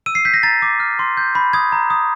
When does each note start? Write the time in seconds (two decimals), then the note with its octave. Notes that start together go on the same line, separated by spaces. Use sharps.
0.06 E6 D#7
0.15 C7
0.25 G6 B6
0.34 A#6
0.43 A#5 A6
0.62 D6
0.80 F6
0.99 C6
1.17 G6
1.35 B5
1.53 D#6 G#6
1.72 A#5
1.90 D#6